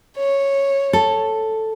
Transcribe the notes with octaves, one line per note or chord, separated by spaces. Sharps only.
C#5
A4